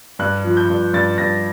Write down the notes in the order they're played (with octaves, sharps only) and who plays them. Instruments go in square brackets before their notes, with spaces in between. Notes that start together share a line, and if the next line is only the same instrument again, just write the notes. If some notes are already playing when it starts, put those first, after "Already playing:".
[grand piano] G2 F#6
F3
G6
G2
G2 A6
G2 A#6